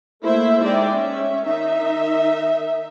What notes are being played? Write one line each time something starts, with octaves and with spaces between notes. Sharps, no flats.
A3 A#3 E4 C5 E5
G#3 D#4 G#4 D5 E5 G5
C#4 E5
D#3 D#4 E5